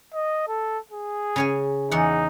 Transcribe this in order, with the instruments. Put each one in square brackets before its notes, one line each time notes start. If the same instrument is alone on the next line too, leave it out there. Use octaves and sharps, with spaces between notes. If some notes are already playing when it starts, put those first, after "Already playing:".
[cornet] D#5
A4
G#4
[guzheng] C#3 C#5 G#5
[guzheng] E2 F#5 [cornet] D#4